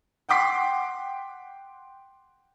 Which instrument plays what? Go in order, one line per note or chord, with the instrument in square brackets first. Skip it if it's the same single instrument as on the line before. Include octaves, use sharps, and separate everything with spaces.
[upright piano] F#5 G5 C6 D6 B6 C7